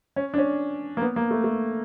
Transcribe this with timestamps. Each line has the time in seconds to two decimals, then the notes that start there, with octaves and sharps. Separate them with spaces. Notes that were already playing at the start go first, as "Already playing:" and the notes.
0.16 C#4
0.34 D4
0.38 C#4
0.97 A#3
1.02 B3
1.16 A#3
1.31 A3
1.44 A3